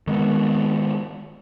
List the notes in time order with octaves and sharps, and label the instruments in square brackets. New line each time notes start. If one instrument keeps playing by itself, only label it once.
[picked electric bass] D#3 G#3 A3 B3